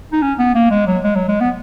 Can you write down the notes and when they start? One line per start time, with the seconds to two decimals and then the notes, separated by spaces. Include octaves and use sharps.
0.12 D#4
0.22 C#4
0.39 B3
0.55 A#3
0.71 G#3
0.87 F#3
1.04 G#3
1.15 F#3
1.29 G#3
1.40 B3